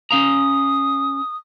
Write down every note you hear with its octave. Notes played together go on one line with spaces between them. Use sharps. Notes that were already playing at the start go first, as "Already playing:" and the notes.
C#4 F5 A#5 D#6